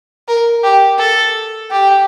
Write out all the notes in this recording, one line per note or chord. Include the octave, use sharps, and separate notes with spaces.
A#4
G4
A4
G4